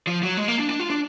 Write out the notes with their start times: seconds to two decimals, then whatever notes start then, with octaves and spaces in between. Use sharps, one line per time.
0.07 F3
0.23 F#3
0.37 G#3
0.48 A#3
0.59 D4
0.70 D4
0.80 F4
0.90 D4